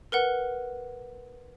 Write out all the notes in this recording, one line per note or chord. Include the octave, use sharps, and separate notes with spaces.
A#4 B4 F#5